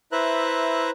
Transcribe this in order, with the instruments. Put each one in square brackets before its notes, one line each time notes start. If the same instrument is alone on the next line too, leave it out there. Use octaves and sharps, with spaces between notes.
[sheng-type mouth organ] E4 B4 C5 E5 A#5 F#6